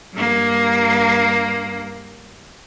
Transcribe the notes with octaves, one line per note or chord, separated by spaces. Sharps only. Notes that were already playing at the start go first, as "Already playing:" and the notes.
G2 A#3